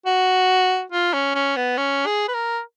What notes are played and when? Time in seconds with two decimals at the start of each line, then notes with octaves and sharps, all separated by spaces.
0.06 F#4
0.92 F4
1.14 C#4
1.35 C#4
1.56 B3
1.78 C#4
2.06 G#4
2.28 B4
2.34 A#4